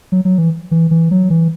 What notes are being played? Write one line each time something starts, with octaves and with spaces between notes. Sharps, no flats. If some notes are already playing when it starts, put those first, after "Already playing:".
F#3
F#3
E3
E3
E3
F#3
E3